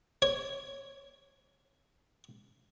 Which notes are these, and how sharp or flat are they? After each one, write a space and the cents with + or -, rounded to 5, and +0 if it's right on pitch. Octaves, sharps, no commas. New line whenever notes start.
C#5 -5